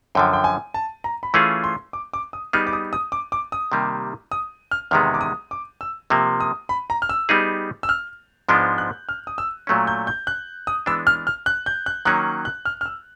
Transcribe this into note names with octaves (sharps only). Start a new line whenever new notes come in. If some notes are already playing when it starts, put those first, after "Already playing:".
F#2 D3 F3 G5
G5
G#5
A5
A#5
B5
E3 A3 C#4 F4 G#4 C6
C6
D6
D6
D#6
G3 B3 D#4 G#4 F6
D6
D#6
D#6
D6
D6
D#6
C3 D#3 G3 A#3
D#6
F6
E2 C3 D#3 G#3 B3 F6
D6
D#6
D6
E6
C3 F3 A#3 E6
D#6
B5
A#5
F6
E6
G3 B3 D#4 G#4
E6
F6
G#2 F3 G#3 B3 D4 G6
F#6
F6
D#6
E6
A#2 F#3 A3 C#4
G6
G6
F#6
D#6
E3 G#3 B3 D4 E6
F6
F6
F#6
G6
F#6
D#3 F#3 A#3 C#4 F#6
F#6
F6
F6
E6